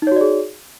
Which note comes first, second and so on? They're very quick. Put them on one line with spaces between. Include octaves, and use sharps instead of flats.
D#4 C#5 F#4 D5 G#4